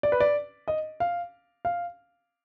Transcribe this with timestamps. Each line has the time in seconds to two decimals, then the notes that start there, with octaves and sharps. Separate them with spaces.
0.03 D5
0.12 B4
0.20 D5
0.68 D#5
1.00 F5
1.65 F5